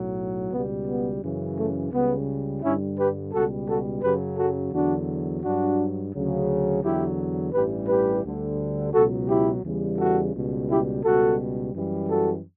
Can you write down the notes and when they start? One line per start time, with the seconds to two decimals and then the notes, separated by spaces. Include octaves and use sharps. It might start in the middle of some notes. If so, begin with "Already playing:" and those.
Already playing: B1 A2 F#3
0.51 C#2 B2 G3 B3
0.87 B3
1.22 F#2 C#3 E3
1.57 A3
1.92 C#2 C#3 G3 B3
2.62 G2 D3 G3 C#4 E4
2.97 G4 B4
3.32 C#2 B2 G3 F#4 A4
3.67 F#4 A4
4.02 F#2 C#3 F#3 G4 B4
4.37 F#4 A4
4.72 E2 D3 F#3 D4 F#4
5.42 G2 F#3 D4 F#4
6.13 D2 C#3 F#3
6.82 E2 D3 F#3 E4 G4
7.52 A1 G2 E3 G3 G4 B4
7.87 G4 B4
8.23 D2 D3 G3
8.92 C#2 B2 F#3 F#4 A4
9.28 E4 G4
9.63 E2 C#3 E3 G3
9.98 F#4 A4
10.33 C#2 B2 G3
10.68 E4 G4
11.03 C#2 B2 G3 F#4 A4
11.73 F#2 E3 G3
12.08 F#4 A4